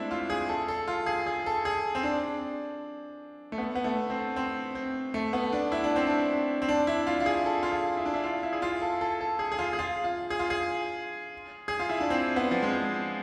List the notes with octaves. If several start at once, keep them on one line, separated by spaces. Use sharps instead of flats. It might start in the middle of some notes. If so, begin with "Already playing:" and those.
Already playing: G#3 A3 C4 D4 E4
F4
G#4
A4
A4
F4
G#4
G#4
A4
G#4
C4
D4
A3
B3
B3
A3
C4
C4
C4
A3
B3
D4
E4
D4
C4
D4
C4
D4
E4
F4
F4
G#4
A4
F4
G#4
E4
D4
E4
F4
E4
G#4
F4
A4
A4
A4
G#4
G#4
F4
G#4
F4
F4
G#4
F4
G#4
G#4
F4
E4
D4
C4
B3
F3
G#3